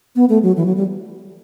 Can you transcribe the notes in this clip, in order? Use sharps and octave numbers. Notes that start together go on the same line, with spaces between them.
B3
A3
F#3
E3
F#3
G3